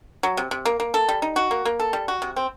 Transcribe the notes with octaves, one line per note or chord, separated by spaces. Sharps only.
F#3
C3
C3
A#3
A#3
A4
G3
D#4
F#4
A#3
A#3
A4
G3
F#4
C3
C4